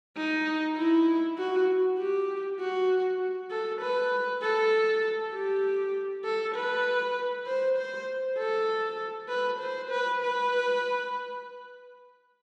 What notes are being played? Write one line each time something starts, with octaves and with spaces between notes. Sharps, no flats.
D#4
E4
F#4
G4
F#4
A4
B4
A4
G4
A4
B4
C5
C5
A4
B4
C5
B4
B4